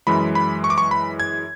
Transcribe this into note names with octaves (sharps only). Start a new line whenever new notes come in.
F#2 E3 G#3 B5
B5
C#6
D6
C#6
B5
G#6